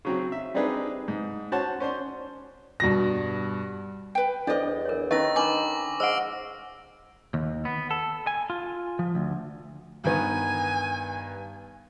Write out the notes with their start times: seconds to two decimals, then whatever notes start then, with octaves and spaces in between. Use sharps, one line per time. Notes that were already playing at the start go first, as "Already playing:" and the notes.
0.05 C#3 F#3 C4
0.32 E5
0.54 G3 C4 D4 D#4 G#4 B4
1.08 G#2
1.52 C#4 F#4 C5 C#5 F#5 A5
1.80 C#4 C5 D5 C6
2.80 G2 B2 A#6
4.15 B4 G5
4.47 E2 D4 A4 C5 D5 D#5
4.86 A#4 C#5
5.11 D#3 C#4 D#4 B4 D#5 C#6 E6 A#6
5.36 D4 B4 G#5 B5 D6 F#7
6.00 G#3 C5 F#5 E6 F6 D7
7.34 D#2
7.65 B3
7.91 A4
8.27 G#5
8.50 F4
8.99 F3
9.15 D2
10.04 G2 D#3 B3 G#5